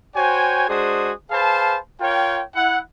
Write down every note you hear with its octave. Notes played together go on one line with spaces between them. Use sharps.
F#4 C5 C#5 G5 G#5
G#3 D4 F#4 G#4 C5 D#6
G#4 B4 C5 F5 A5
F4 A#4 C#5 G5
E4 F#5